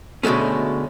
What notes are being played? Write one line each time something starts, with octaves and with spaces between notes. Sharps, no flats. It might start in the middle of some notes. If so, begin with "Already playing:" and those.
D2 B2 G#3 A3 C#4